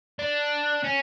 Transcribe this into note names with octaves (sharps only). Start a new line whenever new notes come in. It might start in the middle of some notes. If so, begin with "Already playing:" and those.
D4
C#4